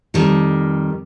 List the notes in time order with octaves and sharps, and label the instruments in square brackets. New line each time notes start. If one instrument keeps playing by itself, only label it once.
[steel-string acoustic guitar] F2 D#3 G3